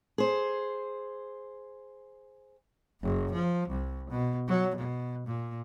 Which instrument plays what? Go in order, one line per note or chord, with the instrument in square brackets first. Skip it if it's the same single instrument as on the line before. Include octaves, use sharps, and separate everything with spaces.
[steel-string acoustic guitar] G#4 C5
[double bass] F#1
F3
C2
B2
F#3
B2
A#2